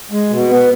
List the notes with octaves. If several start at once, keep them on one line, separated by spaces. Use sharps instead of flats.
G#3
B2
B3